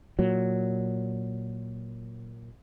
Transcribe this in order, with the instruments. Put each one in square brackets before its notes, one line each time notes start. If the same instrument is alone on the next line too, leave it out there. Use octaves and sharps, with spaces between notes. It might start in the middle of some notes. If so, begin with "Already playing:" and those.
[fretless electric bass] A#2 F#3